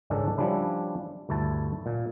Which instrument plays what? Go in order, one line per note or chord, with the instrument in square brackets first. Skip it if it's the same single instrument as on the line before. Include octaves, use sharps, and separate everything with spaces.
[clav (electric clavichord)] C#2 G#2 D#3 C#4 D4 A4
F3 G3 C#4 D4 E4
D2 G2 E4 A5
A#2